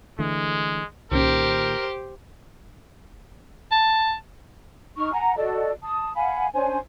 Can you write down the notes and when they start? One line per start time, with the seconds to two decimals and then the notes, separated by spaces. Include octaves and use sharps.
0.19 D3 E3 G#3 A3
1.12 C2 A#2 D#3 C#4 G4 A#4 C5
3.72 A5
4.97 D#4 C#6 F6
5.12 F#5 G#5 A#5
5.36 F#4 A4 D5 D#5
5.82 A5 D#6
6.15 F5 F#5 G#5 B5
6.53 C#4 D4 C5 G#5